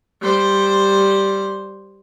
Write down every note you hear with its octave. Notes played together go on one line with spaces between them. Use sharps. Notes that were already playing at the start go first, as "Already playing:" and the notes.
G3 C5